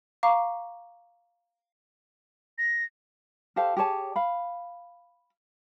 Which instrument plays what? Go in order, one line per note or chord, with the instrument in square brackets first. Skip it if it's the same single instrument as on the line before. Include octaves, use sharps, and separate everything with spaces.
[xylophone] F5 A#5 C#6 D6
[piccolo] A#6
[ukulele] G4 A4 C5 F5
G4 G#4 C#5 A5
F5 B5